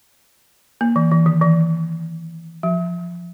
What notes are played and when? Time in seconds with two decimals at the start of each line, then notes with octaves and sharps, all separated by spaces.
0.81 A#3
0.96 E3
1.11 E3
1.26 D#3
1.42 E3
2.63 F3